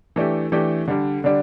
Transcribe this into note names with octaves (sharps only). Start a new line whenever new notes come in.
E3 A3 D4 G4
E3 A3 D4 G4
D3 G3 D4
D3 G3 D4